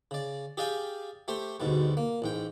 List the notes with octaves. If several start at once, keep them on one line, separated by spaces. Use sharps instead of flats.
C#3 D5
G4 G#4 D5 F5 G5 G#5
A3 G4 C5
D2 G#2 B2 G3
A#3
A1 G#2 G5